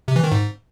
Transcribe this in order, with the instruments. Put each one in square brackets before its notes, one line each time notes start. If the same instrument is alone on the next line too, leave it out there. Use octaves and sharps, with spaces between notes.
[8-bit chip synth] C3
E3
D#3
G#2